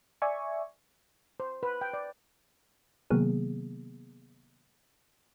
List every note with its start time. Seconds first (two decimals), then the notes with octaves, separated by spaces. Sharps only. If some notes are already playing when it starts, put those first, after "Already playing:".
0.22 D5 E5 G#5 C#6
1.40 C5
1.63 B4
1.81 G5
1.94 D5
3.10 C3 D#3 F#3 A#3 B3 G#4